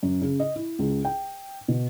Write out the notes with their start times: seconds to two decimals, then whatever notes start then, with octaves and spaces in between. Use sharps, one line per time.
0.03 F#2
0.21 C#3
0.40 D#5
0.56 E4
0.79 C#2
1.05 G5
1.68 B2